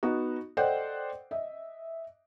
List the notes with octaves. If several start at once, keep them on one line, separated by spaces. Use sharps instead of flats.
B3 D#4 F#4
A4 C5 D5 D#5 F#5 G5
D#5 E5